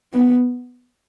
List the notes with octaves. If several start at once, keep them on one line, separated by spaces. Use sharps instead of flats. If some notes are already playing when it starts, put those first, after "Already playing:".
B3